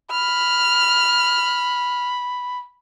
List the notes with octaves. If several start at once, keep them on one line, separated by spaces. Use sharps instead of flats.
B5 F6